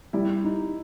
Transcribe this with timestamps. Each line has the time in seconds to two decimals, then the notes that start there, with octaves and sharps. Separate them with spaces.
0.13 G3 E4
0.44 D#4